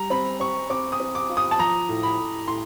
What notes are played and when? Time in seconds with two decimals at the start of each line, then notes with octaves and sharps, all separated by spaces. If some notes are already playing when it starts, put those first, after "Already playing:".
Already playing: G3 A#5
0.10 C4 B5
0.40 C4 C#6
0.70 C4 D6
0.92 D#6
1.00 C4
1.15 D6
1.29 F4
1.37 D#6
1.51 A5
1.59 F3 A#5
1.89 A2
2.03 B5
2.18 A2
2.48 A2 C6